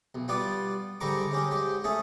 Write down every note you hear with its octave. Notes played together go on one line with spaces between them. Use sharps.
B1
G3 B3 F4 D5
G#2 D3 G3 A#5 C#6 D6
G#3 C#4 G4
G#2 G4
A3 C#4 G#4